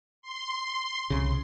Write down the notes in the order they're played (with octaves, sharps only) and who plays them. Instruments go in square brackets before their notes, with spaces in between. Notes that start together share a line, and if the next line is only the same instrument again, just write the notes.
[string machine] C6
[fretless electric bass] C2 C#3